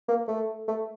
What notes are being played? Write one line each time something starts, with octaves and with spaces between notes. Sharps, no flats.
A#3
A3
A3